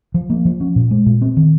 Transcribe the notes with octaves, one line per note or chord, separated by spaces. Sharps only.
F3
A#3
F3
C#4
A#2
G#3
A#2
C4
D#3